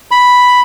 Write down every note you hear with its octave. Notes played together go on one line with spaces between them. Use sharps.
B5